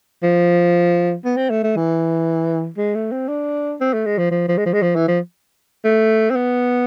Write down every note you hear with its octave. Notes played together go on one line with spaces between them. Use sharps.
F3
B3
C4
A3
A3
E3
G#3
A3
C4
D4
C4
A3
G#3
F3
F3
F3
G#3
F3
G#3
F3
E3
F3
A3
C4
B3